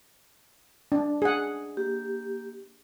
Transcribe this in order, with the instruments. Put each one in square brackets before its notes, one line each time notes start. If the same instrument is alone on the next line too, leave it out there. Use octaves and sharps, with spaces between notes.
[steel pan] D4
G#4 F#5
[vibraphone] A#3 G4